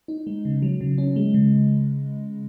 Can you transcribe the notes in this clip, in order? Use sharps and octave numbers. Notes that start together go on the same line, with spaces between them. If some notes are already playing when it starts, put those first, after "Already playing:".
D#4
G#3
C#3
F#3
C#3
C#4
G#3
C#3